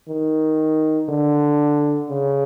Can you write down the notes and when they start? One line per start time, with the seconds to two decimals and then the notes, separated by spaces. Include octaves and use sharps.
0.08 D#3
1.09 D3
2.10 C#3